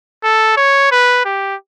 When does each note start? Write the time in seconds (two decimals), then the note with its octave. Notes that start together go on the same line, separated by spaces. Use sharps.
0.24 A4
0.57 C#5
0.92 B4
1.25 G4